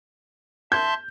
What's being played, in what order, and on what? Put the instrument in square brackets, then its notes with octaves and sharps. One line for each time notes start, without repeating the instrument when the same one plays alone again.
[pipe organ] E5 A5 C6 [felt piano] G6